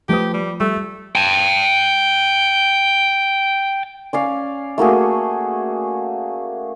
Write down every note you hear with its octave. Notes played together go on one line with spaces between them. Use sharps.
F3 A3 G4 B4 D#6
G3
G3 A3
G5 A5
C#4 D5 F5
A3 A#3 F#4 G#4